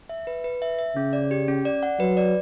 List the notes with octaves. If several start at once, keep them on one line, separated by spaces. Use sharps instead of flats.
E5
B4
B4
E5
E5
C#3 C#4
D5
G4
C#4
D5
F#5
F#3 B4
D5